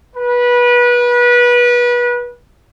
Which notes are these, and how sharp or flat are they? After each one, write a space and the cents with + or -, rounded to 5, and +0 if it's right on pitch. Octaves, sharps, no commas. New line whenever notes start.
B4 -25